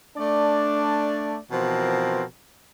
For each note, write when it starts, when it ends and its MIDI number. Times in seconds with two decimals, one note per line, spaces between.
0.17 1.38 57
0.17 1.38 62
0.17 1.38 74
1.51 2.24 47
1.51 2.24 52
1.51 2.24 53
1.51 2.24 60
1.51 2.24 70